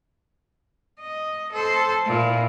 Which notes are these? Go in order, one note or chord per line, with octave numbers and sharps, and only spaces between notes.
D#5
A4 C5
A#2 E4